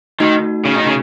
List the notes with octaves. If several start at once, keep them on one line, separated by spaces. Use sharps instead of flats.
D#3 A3 D#4 F#4
C#3
D#3
C#3